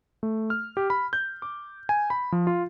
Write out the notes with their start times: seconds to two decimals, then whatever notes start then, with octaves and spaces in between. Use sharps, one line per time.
0.23 A3
0.50 F6
0.77 G4
0.90 B5
1.13 G6
1.42 D6
1.89 G#5
2.10 B5
2.32 F3
2.47 F4